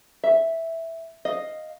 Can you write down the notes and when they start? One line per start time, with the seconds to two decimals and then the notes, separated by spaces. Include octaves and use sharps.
0.24 E5
1.25 D#5 F5